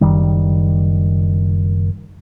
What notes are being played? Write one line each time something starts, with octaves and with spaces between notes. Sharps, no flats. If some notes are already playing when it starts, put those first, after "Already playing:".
F#1 D#3 G3